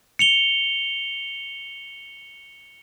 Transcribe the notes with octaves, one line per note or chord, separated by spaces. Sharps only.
C#7 F7 G7